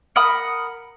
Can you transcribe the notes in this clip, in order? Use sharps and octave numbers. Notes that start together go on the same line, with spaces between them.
A#4 F#5 B5 D#6